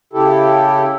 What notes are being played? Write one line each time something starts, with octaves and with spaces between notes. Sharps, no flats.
C#3 E4 G4 A4